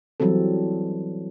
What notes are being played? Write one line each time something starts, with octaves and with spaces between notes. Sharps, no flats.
E3 F#3 G3 C4 A4